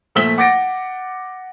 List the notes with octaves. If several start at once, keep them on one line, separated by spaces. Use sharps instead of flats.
A#2 F3 A3 E6 B6 G7
F#5 D6 G6 A6 A#6 D7